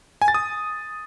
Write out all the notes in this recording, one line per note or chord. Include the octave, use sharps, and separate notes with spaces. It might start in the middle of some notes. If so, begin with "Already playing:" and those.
G#5
A6
D#6